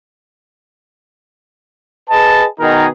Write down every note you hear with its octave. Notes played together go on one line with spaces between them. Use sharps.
G#4 B4 D#5 A5
B2 D#3 B3 D#4 G#4 A#4